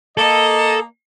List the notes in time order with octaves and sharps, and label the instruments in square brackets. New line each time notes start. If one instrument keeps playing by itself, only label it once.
[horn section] A#3 D#5 [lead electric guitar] A4